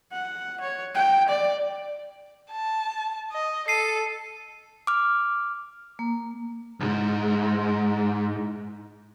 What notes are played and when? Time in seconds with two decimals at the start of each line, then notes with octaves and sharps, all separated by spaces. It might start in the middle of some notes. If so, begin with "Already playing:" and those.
0.12 F#5
0.61 C#5
0.95 G5
1.29 D5
2.51 A5
3.32 D#5
3.68 A4 C7 D#7
4.87 D6 F6
5.99 A#3
6.80 B1 G#2